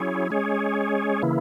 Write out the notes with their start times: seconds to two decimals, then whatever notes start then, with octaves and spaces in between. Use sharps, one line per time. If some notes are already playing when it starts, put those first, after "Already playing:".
Already playing: F#3 C#4 E4 G#4 C#5
0.31 G#3 C#4 G#4 C#5
1.22 C#3 E3 A#3 E4